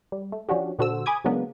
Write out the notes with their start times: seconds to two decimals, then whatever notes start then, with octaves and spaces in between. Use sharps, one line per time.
0.12 G3
0.32 A3
0.49 F3 C#4 D4 F#4 G4
0.79 A#2 D3 F#4 A4 C5 E6
1.06 G#5 B5 D6 D#6 G#6
1.24 C#3 F#3 G#3 A#3 B3 D4